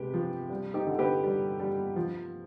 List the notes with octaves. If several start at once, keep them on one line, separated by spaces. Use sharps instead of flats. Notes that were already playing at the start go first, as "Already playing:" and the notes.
Already playing: C3 G#3 G4 B4
F3
G3
D#4 G4
D3
G4 B4
G3
G3
F3